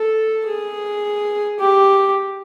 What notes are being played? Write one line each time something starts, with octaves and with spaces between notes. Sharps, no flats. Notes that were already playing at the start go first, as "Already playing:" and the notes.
Already playing: A4
G#4
G4